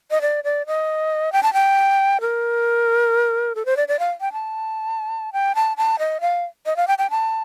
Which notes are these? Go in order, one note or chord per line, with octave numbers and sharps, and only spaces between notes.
D#5
D5
D5
D#5
G5
A5
G5
A#4
A4
C5
D5
D5
F5
G5
A5
G5
A5
A5
D#5
F5
D#5
F5
G5
G5
A5